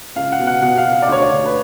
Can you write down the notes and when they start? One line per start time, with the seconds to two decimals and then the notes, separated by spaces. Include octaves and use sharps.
0.16 C#2 F5
0.32 F#5
0.39 B2
0.47 F#5
0.62 B2 F#5
0.78 F5
0.86 B2
0.92 F5
1.02 D5
1.08 D2 C#5
1.23 D5
1.31 D2
1.46 B4